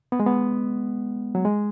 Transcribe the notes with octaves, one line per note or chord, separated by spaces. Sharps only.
B3
G#3
B3
F#3
G#3